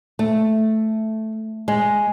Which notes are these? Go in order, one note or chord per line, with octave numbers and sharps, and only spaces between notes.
A3
G#3